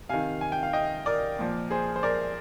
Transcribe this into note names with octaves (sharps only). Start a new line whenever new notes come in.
C3 D#3 F5 G#5
G#5
G5
F5
D#5 G5
A#4 D5
A#2 F3
G#4 C5
C5
A#4 D5